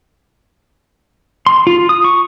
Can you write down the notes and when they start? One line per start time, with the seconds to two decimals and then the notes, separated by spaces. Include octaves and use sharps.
1.46 C6
1.67 F4
1.89 D#6
2.04 C#6